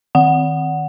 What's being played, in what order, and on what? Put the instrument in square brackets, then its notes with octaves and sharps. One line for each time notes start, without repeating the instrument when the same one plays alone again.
[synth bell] D#3 F#5